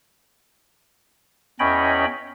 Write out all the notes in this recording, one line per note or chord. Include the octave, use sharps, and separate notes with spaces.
E2 C#4 C#5 D#5 G5 B5